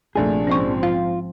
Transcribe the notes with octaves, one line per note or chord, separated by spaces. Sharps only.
A#1 C3 A3 D4 G#4
G#2 F3 C4 C#4 D#5 C#6
F4 F5